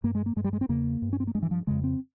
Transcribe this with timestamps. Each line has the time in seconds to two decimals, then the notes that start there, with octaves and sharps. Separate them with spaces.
0.04 G2 A#3
0.15 G#3
0.26 A#3
0.36 G2 G#3
0.44 G3
0.53 G#3
0.61 C4
0.69 E2 C#3 A#3
1.02 G2
1.13 C#4
1.20 C4
1.27 A#3
1.35 G2 G#3
1.42 E3
1.51 F3
1.67 F2 C#3 G#3
1.84 C4